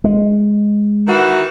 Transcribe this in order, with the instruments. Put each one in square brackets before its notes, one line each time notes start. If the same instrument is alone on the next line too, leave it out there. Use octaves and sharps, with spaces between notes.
[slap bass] G#3
[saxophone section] D#3 E3 F#4